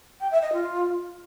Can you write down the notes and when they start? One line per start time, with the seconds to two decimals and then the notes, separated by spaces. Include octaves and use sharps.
0.20 G5
0.31 E5
0.42 D#5
0.53 F4